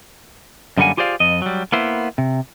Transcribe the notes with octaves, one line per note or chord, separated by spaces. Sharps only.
F#2 D3 G3 A#3 F#5 G#5
F4 G4 G#4 C5 D5 F5
F2 D#5
F#3 G3
A#3 B3 E4 C5
C3